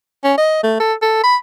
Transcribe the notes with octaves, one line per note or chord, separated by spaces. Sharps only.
C#4
D#5
A3
A4
A4
B5